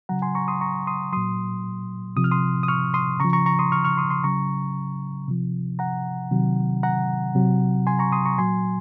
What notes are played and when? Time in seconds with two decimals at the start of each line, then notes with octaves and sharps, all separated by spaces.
0.09 C#3 F#3 F#5 A#5
0.22 G#5 C6
0.35 A#5 C#6
0.48 C6 D#6
0.61 A#5 C#6
0.87 C6 D#6
1.13 A#2 F#3 C6 D#6
2.16 C3 F3 D#6
2.24 F6
2.31 C6 D#6
2.63 D#6
2.68 C#6 F6
2.94 C6 D#6
3.20 C#3 A#5 C#6
3.25 F3
3.33 A#5 C#6
3.46 A#5 C#6
3.59 C6 D#6
3.72 C#6 F6
3.84 C#6 F6
3.97 C6 D#6
4.10 C6 D#6
4.24 C#3 F#3 A#5 C#6
5.28 C3 F3
5.79 F#5 A#5
6.31 C3 D#3 F#3
6.83 F#5 A#5
7.35 C3 F#3
7.87 G#5 C6
7.99 A#5 C#6
8.12 C6 D#6
8.26 A#5 C#6
8.38 A#2 F#3 G#5 C6